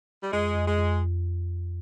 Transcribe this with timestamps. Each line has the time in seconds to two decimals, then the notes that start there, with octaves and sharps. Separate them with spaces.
0.22 G3
0.32 F2 G#3
0.55 F2
0.67 G#3
0.79 F2